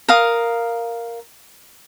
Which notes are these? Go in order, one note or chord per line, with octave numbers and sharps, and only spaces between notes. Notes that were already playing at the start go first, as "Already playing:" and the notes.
A#4 F5 D#6